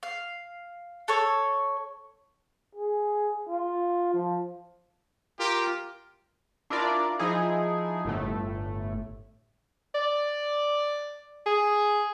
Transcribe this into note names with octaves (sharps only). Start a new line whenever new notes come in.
F5
A4 C#5
G#4
F4
F3
F4 G4 A#4
D4 E4 F4 A#4 D5
F3 D#4 E4 G#4
G1 A2 A3
D5
G#4